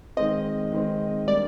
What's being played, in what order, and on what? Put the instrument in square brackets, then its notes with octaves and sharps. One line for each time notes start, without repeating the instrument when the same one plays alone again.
[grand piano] D#3 G#3 C4 [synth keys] D#5
[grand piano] D#3 G#3 C4
[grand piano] G3 A#3 D4 [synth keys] D5